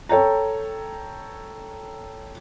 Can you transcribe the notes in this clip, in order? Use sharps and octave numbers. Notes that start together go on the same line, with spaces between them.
A4 C#5 G5 A#5